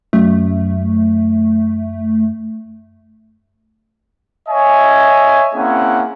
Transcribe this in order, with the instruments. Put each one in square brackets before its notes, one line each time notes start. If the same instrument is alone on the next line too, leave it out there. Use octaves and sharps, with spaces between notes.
[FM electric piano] F#2 [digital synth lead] A3
[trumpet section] C#5 D#5 E5 G#5
A#3 C4 C#4 E4 G#4 F#5